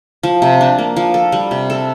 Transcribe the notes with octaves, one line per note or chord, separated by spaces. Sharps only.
F3
C3
D4
A#3
F3
A4
G3
C3
A4